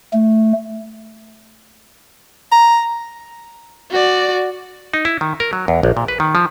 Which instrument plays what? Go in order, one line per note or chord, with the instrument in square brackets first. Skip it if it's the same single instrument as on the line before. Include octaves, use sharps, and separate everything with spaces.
[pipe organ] A3
[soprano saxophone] A#5
[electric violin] F#4 D5
[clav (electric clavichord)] D#4
E4
D#3
A#4
F#3
E2
A#1
A#2
B4
D#3
F3